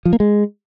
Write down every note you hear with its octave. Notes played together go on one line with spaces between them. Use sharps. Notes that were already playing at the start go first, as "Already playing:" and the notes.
F3
A#3
G#3